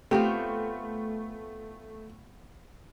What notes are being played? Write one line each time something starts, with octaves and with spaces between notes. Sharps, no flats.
A3 B3 C4 F4 G4 A#5